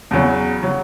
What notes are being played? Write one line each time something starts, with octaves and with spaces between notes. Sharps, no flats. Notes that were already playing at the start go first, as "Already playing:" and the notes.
E2 C#3 F#3
C#3 F#3